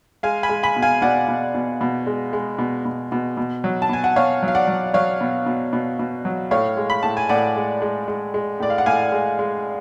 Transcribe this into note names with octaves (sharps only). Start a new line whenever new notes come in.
G#3 F5 G#5
G#5 B5
G#3
G#5 B5
B2
F5 G#5
B2 D5 F#5
B2
B2
B2
G#3
G#3
B2
B2
B2
B2
F#3
A5
B2 G#5
F#5
B2 C#5 F5
F#3
F5
D5 F#5
F#3
F#3 C#5 F5
B2
B2
B2
B2
F#3
A2 C#5 F5
G#3
B5
A2 A5
G#5
A2 D5 F#5
G#3
G#3
G#3
G#3
A2 D5
F5
F#5
A2 F5 G#5
G#3
G#3